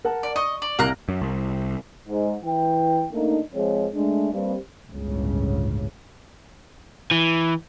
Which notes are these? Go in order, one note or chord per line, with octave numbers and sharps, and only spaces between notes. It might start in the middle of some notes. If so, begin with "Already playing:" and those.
A#4 F#5 A5
D5
D#5 C#6
D5
C2 A#3 A#5 F#6
F#2
C2
G#2
E3 G5
A3 A#3 D4 D#4
F3 G#3 C4 G#4 C#5
G#3 A3 D4
G2 G3 A#3 C4
G1 C#2 A2 C#3
E3